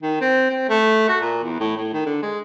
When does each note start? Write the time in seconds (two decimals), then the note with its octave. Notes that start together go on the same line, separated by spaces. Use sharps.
0.02 D#3
0.21 C4
0.50 C4
0.69 A3
1.09 F#4
1.21 A#2
1.43 E2
1.60 A2
1.76 A2
1.93 D#3
2.06 D3
2.22 G#3